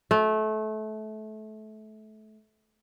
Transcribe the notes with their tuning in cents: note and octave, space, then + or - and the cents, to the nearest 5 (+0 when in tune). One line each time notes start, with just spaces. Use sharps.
A3 -25